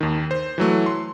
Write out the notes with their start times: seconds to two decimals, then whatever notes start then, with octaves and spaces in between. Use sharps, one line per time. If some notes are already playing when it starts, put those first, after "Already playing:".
0.01 D#2 D#3
0.31 C5
0.58 E3 F#3 A3
0.86 C6